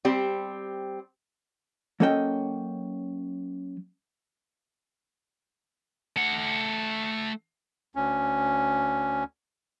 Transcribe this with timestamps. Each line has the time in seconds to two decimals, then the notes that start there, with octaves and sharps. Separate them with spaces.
0.05 G3 C4 G4 C5
2.00 F#3 A#3 C#4 A4 D#5 G5
6.16 A3 F#5
7.95 D2 C#4